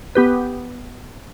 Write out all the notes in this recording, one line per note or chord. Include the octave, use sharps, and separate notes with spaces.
B3 G4 B4